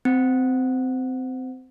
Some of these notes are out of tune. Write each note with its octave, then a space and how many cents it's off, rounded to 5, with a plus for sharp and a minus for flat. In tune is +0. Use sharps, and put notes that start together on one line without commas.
C4 -20